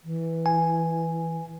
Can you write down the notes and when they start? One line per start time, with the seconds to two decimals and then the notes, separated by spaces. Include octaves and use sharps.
0.04 E3
0.46 G#5